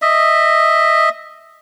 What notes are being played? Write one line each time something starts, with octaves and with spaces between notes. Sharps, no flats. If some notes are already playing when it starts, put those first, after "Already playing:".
D#5 E5